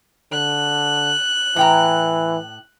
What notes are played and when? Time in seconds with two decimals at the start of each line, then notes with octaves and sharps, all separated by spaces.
0.32 D3 F#6
1.56 A2 E3 G5 A#5